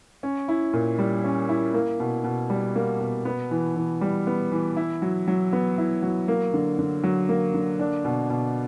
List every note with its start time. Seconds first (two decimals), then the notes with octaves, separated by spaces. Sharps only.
0.23 C#4
0.48 E4
0.73 A#2
0.99 G3
1.24 C#4
1.49 E4
1.74 A#3
2.00 B2
2.24 B2
2.50 G3
2.75 A#3
3.00 B2
3.25 B3
3.51 E3
3.76 E3
4.01 G3
4.27 B3
4.52 E3
4.77 E4
5.02 F#3
5.28 F#3
5.53 B3
5.78 E4
6.02 F#3
6.28 A#3
6.54 D3
6.79 D3
7.04 F#3
7.29 A#3
7.54 D3
7.79 D4
8.05 B2
8.30 B2